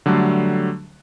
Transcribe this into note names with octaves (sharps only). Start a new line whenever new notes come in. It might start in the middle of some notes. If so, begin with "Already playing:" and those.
D3 F#3 G3 A3 F#6